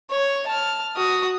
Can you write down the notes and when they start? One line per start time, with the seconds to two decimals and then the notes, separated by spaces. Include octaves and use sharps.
0.10 C#5
0.47 A5 F6
0.96 F#4 D#6